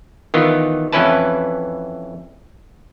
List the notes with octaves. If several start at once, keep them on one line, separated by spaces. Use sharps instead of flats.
D#3 E3 B3 F4
F2 E3 C#4 E4 B4 A5